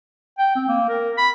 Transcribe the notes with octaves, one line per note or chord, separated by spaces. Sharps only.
G5
C4
A#3
A#4
B5